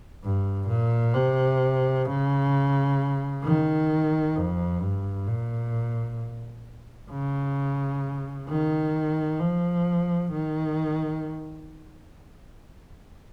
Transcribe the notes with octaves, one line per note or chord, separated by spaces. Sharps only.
G2
A#2
C3
C#3
D#3
F2
G2
A#2
C#3
D#3
F3
D#3